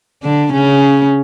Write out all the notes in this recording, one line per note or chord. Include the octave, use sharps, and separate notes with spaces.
D3 D4
C#3 C#4